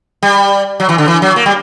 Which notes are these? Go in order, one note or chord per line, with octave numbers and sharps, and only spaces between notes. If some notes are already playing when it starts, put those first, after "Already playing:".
G3
F#3
E3
D3
E3
F#3
A#3
G3